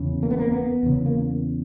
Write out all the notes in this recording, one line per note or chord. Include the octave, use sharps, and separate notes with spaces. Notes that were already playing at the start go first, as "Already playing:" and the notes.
Already playing: E2 C#3
A#3
B3
A#3
B3
E2 C#3
A#3